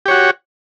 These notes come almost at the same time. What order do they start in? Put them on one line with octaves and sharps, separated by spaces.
G4 C#5 F#4